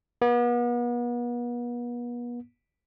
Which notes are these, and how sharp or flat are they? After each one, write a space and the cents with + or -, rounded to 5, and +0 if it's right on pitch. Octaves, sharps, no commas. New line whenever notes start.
B3 -40